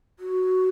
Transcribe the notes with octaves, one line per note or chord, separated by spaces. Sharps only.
F#4